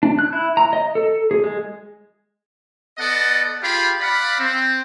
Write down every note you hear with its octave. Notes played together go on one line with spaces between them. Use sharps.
D4
F#6
E4
A#5
D#5
A4
G#4
G#3
B3 A4 D5 D#5 F#5
F4 G4 G#4 F5 B5
D5 F5 F#5 B5
C4